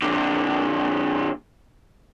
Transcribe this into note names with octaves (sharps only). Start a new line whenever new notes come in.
A#2 D3